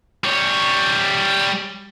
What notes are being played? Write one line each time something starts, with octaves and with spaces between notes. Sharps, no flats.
G3 C#5